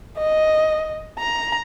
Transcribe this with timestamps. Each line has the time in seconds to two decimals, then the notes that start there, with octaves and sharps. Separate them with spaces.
0.18 D#5
1.19 A#5